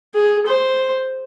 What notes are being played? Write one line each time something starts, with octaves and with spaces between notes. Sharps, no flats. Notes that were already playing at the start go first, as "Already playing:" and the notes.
G#4
C5